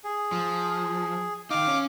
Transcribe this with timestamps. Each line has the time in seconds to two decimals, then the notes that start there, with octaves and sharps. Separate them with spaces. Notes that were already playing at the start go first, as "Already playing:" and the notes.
0.04 G#4
0.32 F3
1.51 D#3 D#4 F5 D6
1.67 C#4